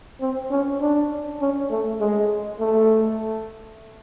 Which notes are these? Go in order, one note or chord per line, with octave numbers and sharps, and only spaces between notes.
C4
C#4
D4
C#4
A3
G#3
A3